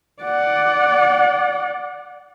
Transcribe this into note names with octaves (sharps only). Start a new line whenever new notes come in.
D5 F#5